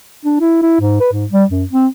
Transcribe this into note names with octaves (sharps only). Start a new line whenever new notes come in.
D4
E4
E4
G#2
B4
G#2
G3
F#2
C4